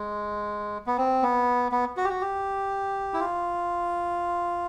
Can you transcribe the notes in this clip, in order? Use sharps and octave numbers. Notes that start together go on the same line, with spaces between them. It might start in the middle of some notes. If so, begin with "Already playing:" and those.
Already playing: G#3
B3
C4
B3
B3
F#4
G4
F#4
G4
E4
F4